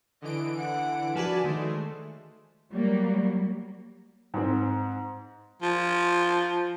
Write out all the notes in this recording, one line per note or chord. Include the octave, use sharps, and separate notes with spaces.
D3 E3 D#5 D7
F#5
F3 D4 F#4 B4 D5 G#5 A5
D#3 G#3 A3 C5
F#3 G3 A#3
G#2 C4
F3